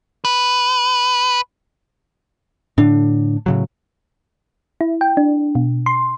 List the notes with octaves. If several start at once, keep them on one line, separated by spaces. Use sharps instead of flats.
B4
A2 D3 D4
A2 C#3 F#3
E4
G5
D4
B2
C6